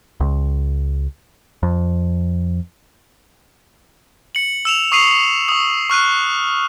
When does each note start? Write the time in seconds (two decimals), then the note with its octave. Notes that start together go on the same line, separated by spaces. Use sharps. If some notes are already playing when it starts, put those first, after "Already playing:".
0.20 C#2
1.63 F2
4.35 C#7 F#7
4.65 E6 E7 F7
4.92 C#6 D#6 C7 D#7 F7
5.48 C#6 D#6
5.90 C#6 F6 F#6 D#7